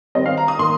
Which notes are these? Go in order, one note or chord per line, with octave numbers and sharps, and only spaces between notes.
D#3 G3 C4 D#5
F5
A#5
D#6
D#3 A#3 C6